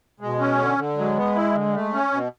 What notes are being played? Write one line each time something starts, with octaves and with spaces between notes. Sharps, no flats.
B2 G#3
C#4
D3
D3
F#3 G#3
B3
E4
D3
A3
C#4
B2